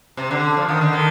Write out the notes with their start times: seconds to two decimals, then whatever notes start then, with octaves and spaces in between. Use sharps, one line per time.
0.17 C3
0.31 D3
0.57 F3
0.69 D#3
0.81 D3
0.93 D#3